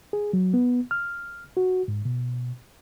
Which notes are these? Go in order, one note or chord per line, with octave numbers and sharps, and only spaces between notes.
G#4
F#3
B3
F6
F#4
G#2
B2